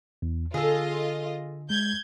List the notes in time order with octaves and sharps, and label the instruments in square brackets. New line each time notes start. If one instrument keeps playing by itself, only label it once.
[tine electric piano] E2
[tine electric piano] D3 [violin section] F4 D#5 [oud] G#4 A4
[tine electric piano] G#3 [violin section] G6 G#6